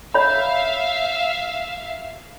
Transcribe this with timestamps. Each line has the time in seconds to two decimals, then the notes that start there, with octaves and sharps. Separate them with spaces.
0.14 C#5 E5 F5 B5